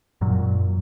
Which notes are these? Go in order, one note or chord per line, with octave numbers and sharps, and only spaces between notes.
F#2 A#2 F#3